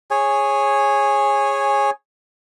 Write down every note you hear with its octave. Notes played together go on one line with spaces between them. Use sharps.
G#4 C#5 G#5